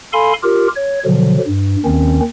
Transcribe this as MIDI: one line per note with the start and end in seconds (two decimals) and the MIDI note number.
0.13 0.33 69
0.13 0.33 77
0.13 0.33 80
0.13 0.33 83
0.13 0.33 84
0.43 0.68 65
0.43 0.68 67
0.43 0.68 70
0.76 1.00 73
1.05 1.38 47
1.05 1.38 50
1.05 1.38 53
1.05 1.38 54
1.47 1.76 43
1.85 2.20 39
1.85 2.20 51
1.85 2.20 60
1.85 2.20 61